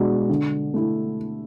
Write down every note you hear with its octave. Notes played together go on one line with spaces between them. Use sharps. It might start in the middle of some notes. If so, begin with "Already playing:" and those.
Already playing: B2 G#3 D4 F#4
D3
A3 E4